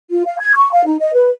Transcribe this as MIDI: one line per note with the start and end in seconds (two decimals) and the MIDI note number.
0.10 0.22 65
0.26 0.39 77
0.39 0.53 92
0.55 0.70 85
0.72 0.84 77
0.85 0.96 63
1.00 1.13 75
1.14 1.29 71